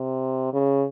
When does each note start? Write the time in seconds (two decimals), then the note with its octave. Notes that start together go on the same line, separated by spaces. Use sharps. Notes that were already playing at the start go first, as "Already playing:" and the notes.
Already playing: C3
0.53 C#3